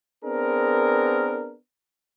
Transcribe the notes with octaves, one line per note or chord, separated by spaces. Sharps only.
B3 C4 D4 G#4 A#4